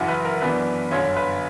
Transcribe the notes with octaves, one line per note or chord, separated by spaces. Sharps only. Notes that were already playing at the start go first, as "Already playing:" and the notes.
Already playing: F#1 F#2 E3 F#5
B4
A#4
F#2 E3 B3 D4 B4
G1 F#2 D3 C#5
B4